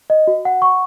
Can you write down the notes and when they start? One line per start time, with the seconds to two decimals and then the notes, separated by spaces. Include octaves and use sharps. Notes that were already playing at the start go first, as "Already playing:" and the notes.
0.10 D#5
0.27 F#4
0.45 F#5
0.62 C#6